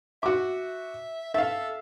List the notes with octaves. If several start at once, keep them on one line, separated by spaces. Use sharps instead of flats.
F#4 E5 D6
A4 E5 F5